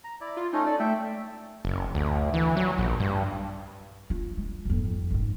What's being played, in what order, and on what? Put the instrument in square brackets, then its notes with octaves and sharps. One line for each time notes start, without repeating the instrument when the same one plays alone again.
[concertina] A#5
E4 D5
[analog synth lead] F4
[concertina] A3 C#4 [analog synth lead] D#4
[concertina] A4 [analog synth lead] D5
[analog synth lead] A3 [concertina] E5 G5
[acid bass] F#1
D2
E3
F#3
A#1
G2
[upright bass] F4
G#3
G#1 F2
G#1 G#2